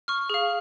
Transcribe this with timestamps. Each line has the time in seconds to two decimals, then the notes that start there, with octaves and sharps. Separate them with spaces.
0.08 C#6 F6
0.30 G#4 F5